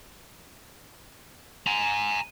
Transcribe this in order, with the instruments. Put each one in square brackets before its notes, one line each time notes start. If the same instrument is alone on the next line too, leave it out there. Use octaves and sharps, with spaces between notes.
[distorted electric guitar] G#5 A#5